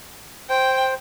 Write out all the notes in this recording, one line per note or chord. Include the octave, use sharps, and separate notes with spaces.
C5 G5